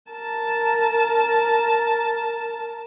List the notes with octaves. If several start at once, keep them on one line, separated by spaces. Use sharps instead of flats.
A#4 A5